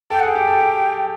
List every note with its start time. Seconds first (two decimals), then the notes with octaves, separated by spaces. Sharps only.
0.10 A4 G5
0.19 F#5
0.23 G#4
0.27 G5
0.35 G4
0.47 A4
0.60 G4